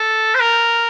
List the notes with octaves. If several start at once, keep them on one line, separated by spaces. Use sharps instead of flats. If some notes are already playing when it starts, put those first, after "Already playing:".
Already playing: A4
C5
A#4